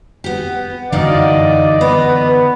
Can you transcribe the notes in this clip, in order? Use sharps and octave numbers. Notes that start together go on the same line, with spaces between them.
B3 G4
F#2 D3 E3 D#4 D5 D#5 F5
B3 B4